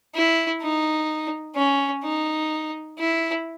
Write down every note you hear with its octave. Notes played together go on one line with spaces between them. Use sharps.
E4
D#4
C#4
D#4
E4